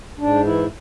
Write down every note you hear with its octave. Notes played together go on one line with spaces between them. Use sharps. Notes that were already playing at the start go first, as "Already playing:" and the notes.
G#2 D4
E3 E4